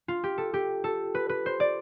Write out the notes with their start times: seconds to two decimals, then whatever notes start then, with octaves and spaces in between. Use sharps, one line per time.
0.08 F4
0.24 G4
0.38 A4
0.54 G4
0.84 A4
1.15 B4
1.29 B4
1.46 C5
1.60 D5